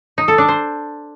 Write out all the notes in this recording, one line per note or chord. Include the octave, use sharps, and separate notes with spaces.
D#4
A4
D4
C5